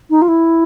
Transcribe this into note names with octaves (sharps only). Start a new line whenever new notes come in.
D#4
F4
E4